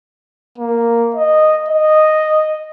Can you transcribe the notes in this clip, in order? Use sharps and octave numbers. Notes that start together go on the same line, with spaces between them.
A#3
D#5
D#5